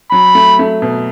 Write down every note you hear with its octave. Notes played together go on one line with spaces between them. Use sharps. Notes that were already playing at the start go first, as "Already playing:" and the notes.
F#3 B5
A3
A3
B2